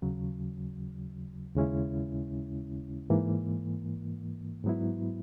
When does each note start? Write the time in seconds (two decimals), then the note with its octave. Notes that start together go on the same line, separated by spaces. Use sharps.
0.02 D#2 C#3 F#3
1.56 D#2 C#3 G#3 C#4 E4
3.10 G#2 E3 A#3
4.64 G#2 F#3 B3 E4